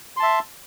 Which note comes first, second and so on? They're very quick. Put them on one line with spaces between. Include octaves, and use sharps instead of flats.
C6 A5 E5